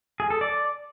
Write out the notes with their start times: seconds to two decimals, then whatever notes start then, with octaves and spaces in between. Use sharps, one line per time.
0.20 G#4
0.30 A4
0.41 D5